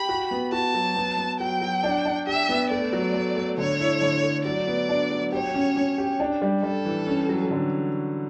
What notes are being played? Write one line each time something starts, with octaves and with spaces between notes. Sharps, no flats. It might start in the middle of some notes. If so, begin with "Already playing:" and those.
Already playing: G4 B5
F#4
B3
F#4 A5
F#3
B3
B3
F#3 G5
F#3
D4
D4
G4 E5
B3
A3 D5
F#3
A3
A3
D3 C#5
E4
D3
A3
F#3 D5
B3
D4
F#3
G4 C#5
C#4
C#4
G4
D4
G3
G3 A4
E3
C#4
F#3
D3